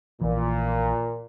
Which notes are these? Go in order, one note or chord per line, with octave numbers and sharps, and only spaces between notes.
A#1 A#2 E3